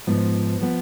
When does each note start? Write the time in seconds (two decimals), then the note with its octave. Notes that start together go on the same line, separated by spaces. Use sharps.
0.07 G#2 F3 B3
0.61 F3 B3